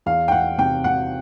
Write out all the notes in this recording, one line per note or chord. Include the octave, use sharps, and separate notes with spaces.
E2 F5
G5
E2 F#5
C3 G5
C3 F#5